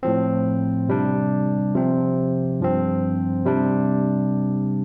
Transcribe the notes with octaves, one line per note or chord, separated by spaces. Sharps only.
A2 F3 C4
C3 G3 D4
C3 F3 C4
G2 F3 C4
C3 G3 D4